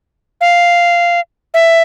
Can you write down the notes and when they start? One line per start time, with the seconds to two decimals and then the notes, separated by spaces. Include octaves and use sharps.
0.41 F5
1.54 E5